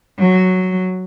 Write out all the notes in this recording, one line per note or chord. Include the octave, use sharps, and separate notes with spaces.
F#3